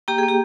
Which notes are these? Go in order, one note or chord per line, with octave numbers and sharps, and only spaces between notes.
A#3 G4 G5
G#4
A#3
G4